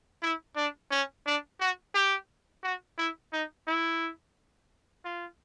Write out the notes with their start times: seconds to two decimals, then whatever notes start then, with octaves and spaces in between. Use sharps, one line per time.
0.22 E4
0.56 D4
0.91 C#4
1.26 D4
1.60 F#4
1.94 G4
2.64 F#4
2.98 E4
3.33 D#4
3.67 E4
5.05 F4